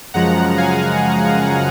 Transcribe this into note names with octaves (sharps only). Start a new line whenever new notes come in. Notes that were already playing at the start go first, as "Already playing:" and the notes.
F#2 C#3 F3 G#3 F#5 A#5
F5 G#5